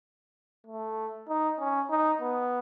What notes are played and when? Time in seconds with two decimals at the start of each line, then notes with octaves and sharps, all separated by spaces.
0.67 A3
1.29 D#4
1.59 C#4
1.90 D#4
2.21 B3